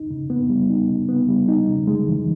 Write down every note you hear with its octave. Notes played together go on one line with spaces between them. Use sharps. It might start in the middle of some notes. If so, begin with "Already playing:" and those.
Already playing: D#4
C#3
B3
G3
D#4
C#3
B3
G3
D#4
C#3
G#3
E3